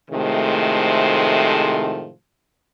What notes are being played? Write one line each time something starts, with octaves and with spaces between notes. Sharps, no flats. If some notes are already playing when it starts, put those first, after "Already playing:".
A2 C3 D#3 F3 G#3 A3